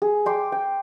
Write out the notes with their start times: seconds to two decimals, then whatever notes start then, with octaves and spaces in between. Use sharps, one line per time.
0.02 G#4
0.26 G5 C6 D6
0.52 G5